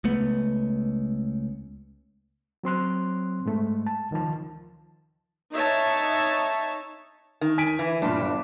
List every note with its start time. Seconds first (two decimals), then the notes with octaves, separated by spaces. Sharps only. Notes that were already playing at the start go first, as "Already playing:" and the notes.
0.04 C#2 A3 B3
2.63 F#3 C4 C6 F#6
3.45 G#2 G#3 A3
3.87 A5
4.11 C#2 D#3 F3 A5
5.54 D#4 C#5 E5 A5
7.41 D#3
7.58 G#5 B6 D7
7.79 E3
8.02 G2 A#2 D4
8.20 G1